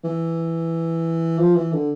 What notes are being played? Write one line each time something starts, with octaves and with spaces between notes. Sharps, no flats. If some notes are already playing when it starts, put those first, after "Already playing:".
E3
F3
E3
D3